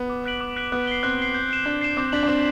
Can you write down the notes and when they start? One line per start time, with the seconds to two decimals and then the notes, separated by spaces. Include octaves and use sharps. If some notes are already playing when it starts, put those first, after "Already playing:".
Already playing: B3
0.10 D6
0.25 F#6 B6 D7 F#7
0.41 D6
0.56 F#6 B6 D7 F#7
0.72 B3 F#6
0.87 C7 G7
1.03 C4 F#6
1.19 C7 G7
1.34 G6
1.50 C7 E7
1.65 D4 G6
1.81 C7 E7
1.97 C4 D6
2.12 D4 F#6 B6 F#7
2.23 D4
2.28 C4 D6